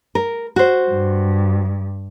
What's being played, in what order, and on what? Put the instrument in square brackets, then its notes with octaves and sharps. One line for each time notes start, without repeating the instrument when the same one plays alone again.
[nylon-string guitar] A#4
F#4 C5
[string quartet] G2